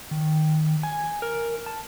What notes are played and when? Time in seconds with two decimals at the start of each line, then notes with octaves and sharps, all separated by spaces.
0.11 D#3
0.83 G#5
1.22 A#4
1.66 A5